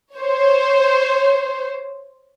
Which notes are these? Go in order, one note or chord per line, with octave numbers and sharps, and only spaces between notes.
C5 C#5